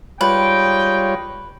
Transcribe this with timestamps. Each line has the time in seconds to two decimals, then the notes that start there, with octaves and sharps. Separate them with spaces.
0.21 G#2 G3 F4 B4 C#5 D#5 G5